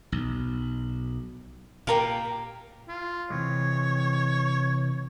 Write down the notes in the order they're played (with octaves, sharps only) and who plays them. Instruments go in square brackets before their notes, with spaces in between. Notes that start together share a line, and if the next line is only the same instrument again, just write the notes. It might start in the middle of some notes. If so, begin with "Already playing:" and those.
[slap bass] B1
[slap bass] A#2 [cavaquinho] G4 A#4 F5
[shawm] F4
[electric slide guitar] C3 E3 G#3 [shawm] C#5